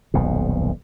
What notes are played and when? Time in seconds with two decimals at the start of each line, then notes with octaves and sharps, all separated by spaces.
0.14 D#1 B1 F2 B2